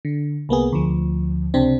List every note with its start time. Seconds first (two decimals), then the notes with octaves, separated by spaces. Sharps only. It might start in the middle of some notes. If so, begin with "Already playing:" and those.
0.05 D3
0.49 C2 A#3 B3 G#4
0.73 D2 F3
1.54 C#2 C3 C4 D4